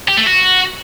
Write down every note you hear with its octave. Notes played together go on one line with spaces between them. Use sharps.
G4
A3
F#4